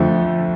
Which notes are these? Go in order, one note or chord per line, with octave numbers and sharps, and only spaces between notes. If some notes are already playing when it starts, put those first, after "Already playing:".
Already playing: F2 D3 F3 A3